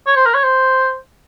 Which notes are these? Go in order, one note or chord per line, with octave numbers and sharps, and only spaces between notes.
C#5
C5
A#4
C#5
C5